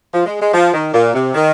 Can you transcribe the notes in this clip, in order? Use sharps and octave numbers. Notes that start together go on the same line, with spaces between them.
F3
G#3
G#3
F3
D#3
A#2
C3
D#3